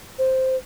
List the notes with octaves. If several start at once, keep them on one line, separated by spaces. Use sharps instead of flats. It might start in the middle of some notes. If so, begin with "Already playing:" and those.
C5